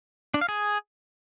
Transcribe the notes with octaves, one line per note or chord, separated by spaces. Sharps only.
D4
F5
G#4